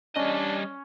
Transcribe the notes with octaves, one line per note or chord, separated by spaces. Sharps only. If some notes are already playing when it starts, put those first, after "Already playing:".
G3 C#4 D4 D#5